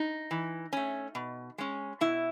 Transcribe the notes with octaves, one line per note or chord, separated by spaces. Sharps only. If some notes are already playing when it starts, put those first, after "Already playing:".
Already playing: D#4
E3
A3 C#4
B2
G#3 C#4
B2 E4